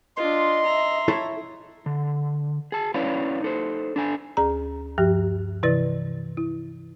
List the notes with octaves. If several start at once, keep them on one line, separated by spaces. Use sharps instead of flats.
D4 F4 D#5 C6
E5 A#5
E4 A4 C#5
D3
G#4 A5
C#4 E4 B4 C#5 D5 F5
D#4 A4 C5
D4 A4 G#5
D2 G#4 A#5
G2 F3 G4
C3 E3 E4 B4 D5 A6
E4